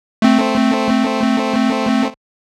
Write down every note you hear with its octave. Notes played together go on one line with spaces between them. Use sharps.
A3 C4